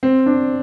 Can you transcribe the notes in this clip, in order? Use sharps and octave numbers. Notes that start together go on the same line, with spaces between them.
C4
D4